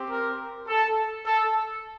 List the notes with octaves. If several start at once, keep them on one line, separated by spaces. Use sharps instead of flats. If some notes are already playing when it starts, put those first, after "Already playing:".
Already playing: C4 G4
A#4
A4
A4